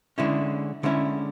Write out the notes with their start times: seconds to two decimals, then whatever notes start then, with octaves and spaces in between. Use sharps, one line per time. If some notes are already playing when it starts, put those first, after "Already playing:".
0.18 D3 G#3 C#4 E4
0.83 D3 G#3 C#4 E4